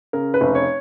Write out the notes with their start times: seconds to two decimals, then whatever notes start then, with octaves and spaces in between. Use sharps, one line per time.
0.13 C#3 A#4
0.34 B4
0.41 F1
0.55 C#5